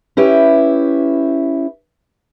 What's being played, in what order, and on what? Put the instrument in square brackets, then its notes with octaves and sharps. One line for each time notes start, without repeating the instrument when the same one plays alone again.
[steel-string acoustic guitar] C#4 E4 G4 B4